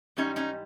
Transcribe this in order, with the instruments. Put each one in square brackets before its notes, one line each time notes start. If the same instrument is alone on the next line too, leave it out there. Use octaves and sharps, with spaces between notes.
[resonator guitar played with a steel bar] G#2 E3 G3 C#4 D#4
C#4 D#4